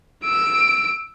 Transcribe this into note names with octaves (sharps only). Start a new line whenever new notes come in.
E6 D7